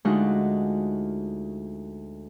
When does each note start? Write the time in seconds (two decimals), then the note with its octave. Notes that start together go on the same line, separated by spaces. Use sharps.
0.05 D2 G#3 D#4 F4 F#4 F#6